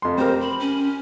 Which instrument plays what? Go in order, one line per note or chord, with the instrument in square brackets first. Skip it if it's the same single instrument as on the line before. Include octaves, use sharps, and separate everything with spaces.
[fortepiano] F2 C6
[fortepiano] C4 G4 A#4 [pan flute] C5
[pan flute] B5
C#4